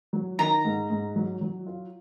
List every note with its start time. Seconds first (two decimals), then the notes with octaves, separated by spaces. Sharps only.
0.13 F#3
0.39 D#3 A#5
0.65 G#2
0.90 G#2
1.16 F#3
1.41 F#3
1.67 F4